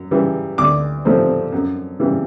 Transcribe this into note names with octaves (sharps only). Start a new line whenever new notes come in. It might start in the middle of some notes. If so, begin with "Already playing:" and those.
Already playing: F#2
C#3 E3 G3
D2 D6
C3 F3 A3 C4
F#2
C#3 E3 G3